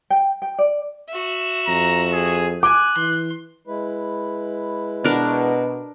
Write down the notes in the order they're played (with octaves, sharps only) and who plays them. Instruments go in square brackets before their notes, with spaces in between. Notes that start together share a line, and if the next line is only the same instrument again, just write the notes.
[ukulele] G5
G5
D5
[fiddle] F#4 E5
[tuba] F2 [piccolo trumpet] A#5
[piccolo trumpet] G#4
[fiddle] G#5 [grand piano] D6 [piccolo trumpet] F#6
[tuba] E3 [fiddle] C6
[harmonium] G#3 E4 B4
[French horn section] B2 [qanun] D4 A#4